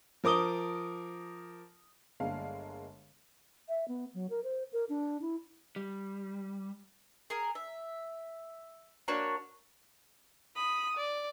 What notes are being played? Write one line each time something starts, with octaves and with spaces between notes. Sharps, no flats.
F3 A#4 D6 D#6 G7
G1 D3 G#3 A#3 F5 A5
E5
B3
F#3
A#4
C5
A#4
D4
E4
G3
G#4 A#4
E5
A#3 D4 F#4 C#5
B5 D#6
D5